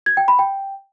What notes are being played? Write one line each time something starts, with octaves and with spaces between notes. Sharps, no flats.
G#6
G5
B5
G5